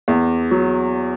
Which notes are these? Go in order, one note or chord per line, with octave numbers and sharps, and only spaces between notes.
E2
F#3